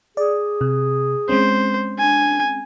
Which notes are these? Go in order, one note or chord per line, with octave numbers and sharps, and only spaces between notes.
G#4 D5
C3
G#3 C4 C#4 C5
D4 G#5